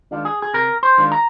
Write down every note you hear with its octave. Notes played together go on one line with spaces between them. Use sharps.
D#3 G#3 D4 F4
G#4
G#4
C3 A#4
C5
D#3 G#3 D4 F4
A#5